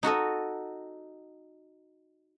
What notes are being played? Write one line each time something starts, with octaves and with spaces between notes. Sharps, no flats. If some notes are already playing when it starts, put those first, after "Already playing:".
D#4 F#4 A4 D#5